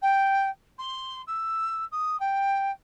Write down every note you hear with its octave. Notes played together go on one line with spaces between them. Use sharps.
G5
C6
E6
D#6
G5